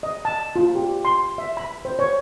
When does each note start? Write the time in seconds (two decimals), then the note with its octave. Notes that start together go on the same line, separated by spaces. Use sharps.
0.03 D#5
0.25 A5
0.56 F4
0.75 G4
1.05 C6
1.38 E5
1.57 B5
1.85 C5
1.99 C#5